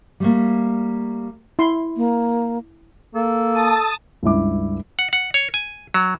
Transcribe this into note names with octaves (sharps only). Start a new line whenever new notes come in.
G3 A3 A#3
E4 C6
A#3
A#3 A4
A5 D#6
C#2 G2 E4 D6
F#5
F#5
C#5
G#5
F#3